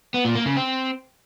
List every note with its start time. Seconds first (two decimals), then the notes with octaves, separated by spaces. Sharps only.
0.14 B3
0.25 A#2
0.35 A#3
0.46 C#3
0.56 C4